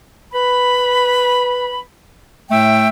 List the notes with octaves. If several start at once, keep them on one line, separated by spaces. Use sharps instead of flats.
B4 B5
A2 A3 E5 G5